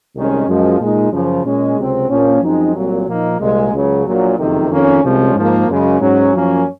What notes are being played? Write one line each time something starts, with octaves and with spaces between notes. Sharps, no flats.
C2 C3 D#3 G#3 C#4
F#2 F3 G#3
A#2 G#3 D#4
F#2 C#3 F3
A#2 G#3 C#4
C#2 C3 F#3 C4
A#1 A#2 F3 A#3 C#4
F#2 F3 G#3 C4 D#4
C2 A#2 F#3
A#2 F3 A#3 D#4
C2 A#2 G#3
C#2 C#3 F#3
A#1 A#2 F#3
F#1 F2 C3 D#3
F2 D#3 A#3 C#4
C2 C3 F3 G#3 C#4
G#2 F3 A#3
F#2 C#3 G#3
G#2 F#3 C#4
F#2 F3 A#3 C#4